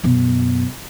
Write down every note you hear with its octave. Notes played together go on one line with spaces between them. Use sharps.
F#2 B2